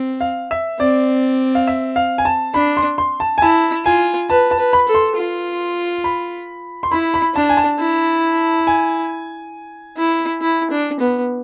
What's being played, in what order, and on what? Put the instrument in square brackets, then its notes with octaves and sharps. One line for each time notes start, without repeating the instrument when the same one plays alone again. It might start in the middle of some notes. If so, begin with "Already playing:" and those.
Already playing: [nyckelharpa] C4
[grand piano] F5
E5
[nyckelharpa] C4 [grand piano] D5
[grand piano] F5
E5
F5
G#5
A5
[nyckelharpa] D4 [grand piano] B5
[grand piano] C6
C6
A5
G#5
[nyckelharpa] E4 [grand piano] A5
[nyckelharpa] F4 [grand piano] G#5
[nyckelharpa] B4 [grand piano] A5
[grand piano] A5
[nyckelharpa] B4
[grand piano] B5
[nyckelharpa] A4
[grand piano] C6
[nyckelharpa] F4
[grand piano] B5
C6
[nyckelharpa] E4 [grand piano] B5
[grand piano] B5
[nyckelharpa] D4 [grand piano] A5
[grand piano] G#5
A5
[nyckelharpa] E4
[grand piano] G#5
[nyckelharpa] E4
E4
D4
B3